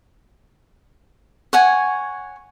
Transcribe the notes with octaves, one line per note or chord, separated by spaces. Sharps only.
C#5 F#5 G#5